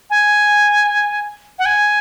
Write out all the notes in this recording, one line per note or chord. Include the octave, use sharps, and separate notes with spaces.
G#5
F#5
G#5